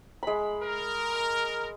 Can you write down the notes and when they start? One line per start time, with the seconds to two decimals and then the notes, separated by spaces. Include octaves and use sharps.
0.23 G#3 B5
0.62 A#4